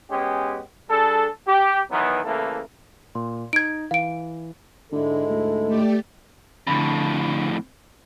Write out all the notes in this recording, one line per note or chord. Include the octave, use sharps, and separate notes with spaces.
G#3 B3 C#4 G4
G3 D4 G#4 A4
G4
D#3 E3 F#3 B3
C#3 E3 A3 A#3 E4 A4
A#2 C6
D#4 G#6 D7
E3 F5 D7
G#2 D3 G#3 E4 A4
D2
A3 G4 D5
F2 A2 D3 A5 B5